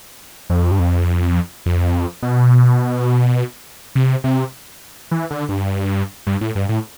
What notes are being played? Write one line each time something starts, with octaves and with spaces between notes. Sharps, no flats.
F2
G2
F2
F2
B2
C3
C3
E3
D3
G2
G2
A2
G2
A2